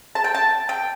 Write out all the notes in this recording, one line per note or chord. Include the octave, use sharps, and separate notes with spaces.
A5
G5
A5
G5